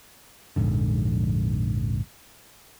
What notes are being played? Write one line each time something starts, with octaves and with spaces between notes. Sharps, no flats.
A#1 F2 G#2 D3